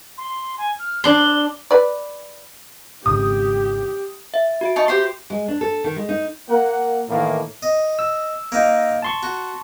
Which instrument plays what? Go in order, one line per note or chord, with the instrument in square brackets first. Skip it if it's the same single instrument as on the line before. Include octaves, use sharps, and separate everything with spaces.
[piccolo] C6
G#5
F6
[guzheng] D4 C6 [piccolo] G7
[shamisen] B4 D5
[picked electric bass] G#1 G#2 C#3 [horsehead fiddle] G4 [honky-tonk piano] D#6
[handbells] E5
F#4 E5 D7
[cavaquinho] D#4 A5 C#6
G4 C5 C6
[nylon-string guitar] G#3
D4
A4
D#3
G#3
D#4
[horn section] A#3 A#4 F#5
A2 D#3 E3 A#3
[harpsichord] D#5
[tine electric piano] E6
[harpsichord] A#3 D#4
[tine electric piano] A5 C6 C#6
[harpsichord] F#4